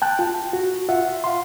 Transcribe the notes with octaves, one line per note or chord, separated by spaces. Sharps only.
G5 A5 F#6
F4
F#4
F4 E5 F#5
F5 C6